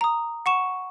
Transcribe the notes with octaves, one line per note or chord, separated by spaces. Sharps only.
A#5 D#6
F#5 C#6 E7